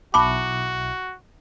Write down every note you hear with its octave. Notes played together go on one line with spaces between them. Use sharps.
B1 E4 F#4 A5 B5 D6